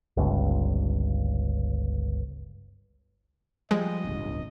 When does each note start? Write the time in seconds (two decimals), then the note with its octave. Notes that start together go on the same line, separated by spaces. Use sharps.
0.17 G1 C#2
3.71 F3 G3 G#3 D#5
4.04 D1 G1 C#2